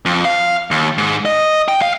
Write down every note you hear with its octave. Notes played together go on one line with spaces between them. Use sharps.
F2
F5
D#2
G#2
D#5
G5
F5